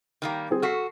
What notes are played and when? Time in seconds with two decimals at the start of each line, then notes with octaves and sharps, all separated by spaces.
0.22 D#3 G3 A#3
0.50 G3 C4 G#4
0.62 F#4 A4 F6 B6 C7